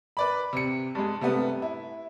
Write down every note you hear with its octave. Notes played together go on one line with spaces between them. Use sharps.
B4 D5 B5
C3 C#7
G2 G#3
C3 G3 A3 B3
E4